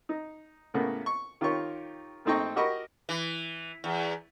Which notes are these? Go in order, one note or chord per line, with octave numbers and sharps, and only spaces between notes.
D#4
A2 C#3 A#3 B3
C#6
D#3 F4 G4 C#5 C#6
A#1 A3 C4 D#4 G5 C#6
F#4 G4 A#4 D#5 B5 C#6
E3
E2